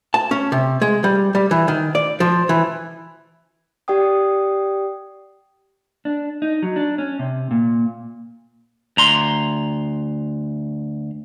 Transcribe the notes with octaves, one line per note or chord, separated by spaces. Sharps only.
A5
C#4
C3
G#3
G3
G3
E3
D#3
D5
F3
E3
G4 D5 F#5 G5 D#6
D4
D#4
F#3
D4
C#4
C3
A#2
D2 A#5 C6